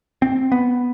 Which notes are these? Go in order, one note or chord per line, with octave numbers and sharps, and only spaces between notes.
C4
B3